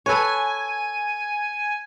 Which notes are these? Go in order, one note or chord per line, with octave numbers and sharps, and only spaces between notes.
A4 B4 C#5 G#5